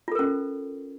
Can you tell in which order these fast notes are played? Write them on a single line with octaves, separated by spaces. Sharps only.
F4 A4 A#4 C#4